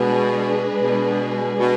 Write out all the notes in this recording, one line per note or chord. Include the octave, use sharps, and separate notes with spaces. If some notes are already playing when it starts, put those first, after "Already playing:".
Already playing: B2 G#3 D4 G#4 B4
B2
B2